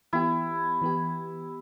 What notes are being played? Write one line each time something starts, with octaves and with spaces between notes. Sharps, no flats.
E3 B3 E4 G4
E3 B3 G4